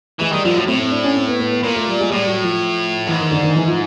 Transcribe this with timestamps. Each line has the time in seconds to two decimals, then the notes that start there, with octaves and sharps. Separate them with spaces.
0.20 E3 G#3
0.32 D#3 G3
0.44 D3 F3
0.50 A#2
0.56 A2 F#3
0.67 A2 C4
0.80 C4
0.91 D4
1.04 C#4
1.16 C4
1.28 B3
1.40 B3
1.52 B3
1.63 A#2 A#3
1.76 A3
1.88 G3
2.00 G#3
2.12 A2 G3
2.27 F#3
2.43 F3
3.07 G#2 E3
3.20 D#3
3.31 D3
3.43 D#3
3.55 E3
3.67 F3